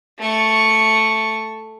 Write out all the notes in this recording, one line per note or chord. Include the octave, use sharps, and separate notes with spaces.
A3 C#6